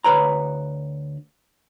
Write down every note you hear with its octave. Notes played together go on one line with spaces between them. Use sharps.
D2 B4 C#5 A#5